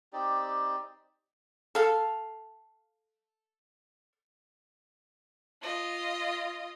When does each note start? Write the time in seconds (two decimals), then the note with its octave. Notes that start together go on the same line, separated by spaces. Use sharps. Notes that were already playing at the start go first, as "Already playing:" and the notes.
0.13 C4 D#4 G4 D5
1.75 A4 F5
5.62 F4 D#5